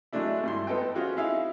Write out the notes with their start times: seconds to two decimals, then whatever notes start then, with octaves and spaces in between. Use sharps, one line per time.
0.13 F#3 G#3 A3 D4 E4
0.44 G2 E4 C6
0.67 B3 A4 D#5 G5
0.95 C4 C#4 F4 F#4 G#4
1.16 D#4 E4 G#4 E5 F5